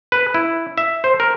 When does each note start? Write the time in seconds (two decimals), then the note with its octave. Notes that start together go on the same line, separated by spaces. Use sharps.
0.12 B4
0.34 E4
0.78 E5
1.04 C5
1.20 A#4